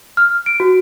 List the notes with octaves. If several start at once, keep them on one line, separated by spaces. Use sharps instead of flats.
F6
D7
F#4